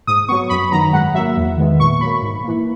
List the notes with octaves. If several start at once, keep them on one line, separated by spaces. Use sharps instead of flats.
G#2 D#6
F#3 B3 C#6
F#2 B5
D#3 F#3 B3 A#5
G#2 F#5
F#3 A#3 E5
E2
D#3 G#3 B3
A#2 C#6
F#3 A#3 B5
G#2
E3 A#3